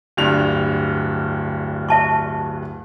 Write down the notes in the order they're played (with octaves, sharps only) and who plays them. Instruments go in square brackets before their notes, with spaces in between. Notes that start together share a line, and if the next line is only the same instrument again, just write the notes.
[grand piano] D1 G2 F7
[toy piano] E5 A5 C#6